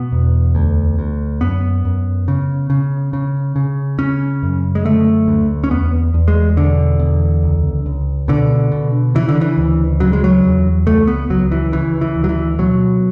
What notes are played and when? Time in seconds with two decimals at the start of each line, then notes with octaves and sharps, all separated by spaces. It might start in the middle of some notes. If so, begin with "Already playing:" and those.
Already playing: B2 B3
0.12 E2
0.55 D2
0.99 D2
1.41 F#2 B3
1.85 F#2
2.28 C#3
2.70 C#3
3.13 C#3
3.56 C#3
3.99 C#3 C#4
4.43 F#2
4.75 G#3
4.85 D3 A3
5.28 D2
5.64 C#4
5.70 E2 B3
6.14 E2
6.28 G#3
6.57 B2 D3
7.00 E2
7.43 C#2
7.86 C#2
8.28 B2 D3
8.72 B2
9.15 C#3 E3
9.29 D3
9.41 E3
9.58 D2
10.00 C#3 F#3
10.13 G#3
10.24 F#3
10.43 E2
10.86 C#2 A3
11.07 B3
11.30 C#2 F#3
11.51 E3
11.72 C#3 E3
12.01 E3
12.15 D2
12.24 F#3
12.29 E3
12.59 B2 F#3